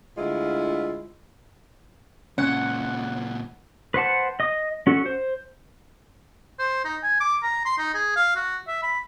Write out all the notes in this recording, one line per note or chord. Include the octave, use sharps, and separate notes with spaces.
D2 G#3 E4 F4
C#2 A#2 C#4 F#5
B4 C5 F#5 A5
D#5 D#6
C#4 F#4 A4
C5
C5
D#4
G#5
D6
A#5
C6
D#4
G#4
F5
F#4
E5
B5